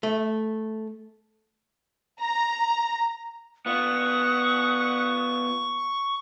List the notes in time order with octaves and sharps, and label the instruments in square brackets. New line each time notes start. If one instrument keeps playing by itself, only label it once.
[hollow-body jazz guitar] A3
[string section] A#5
[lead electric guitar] B3 F4 [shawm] F#5 [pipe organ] C#6 [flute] D#6